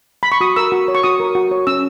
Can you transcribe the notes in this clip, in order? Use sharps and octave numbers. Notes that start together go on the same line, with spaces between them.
B5
C#6
F#4 D#6
A#4 E6
F#4
C#5
C#6
F#4 D#6
A#4
F#4
C#5
C#4 E6